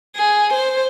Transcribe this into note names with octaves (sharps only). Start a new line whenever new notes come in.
G#4
C5